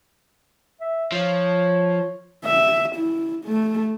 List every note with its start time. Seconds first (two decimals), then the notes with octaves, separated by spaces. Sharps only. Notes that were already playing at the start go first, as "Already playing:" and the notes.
0.81 E5
1.12 F3 C#5
2.45 E5
2.96 E4
3.45 A3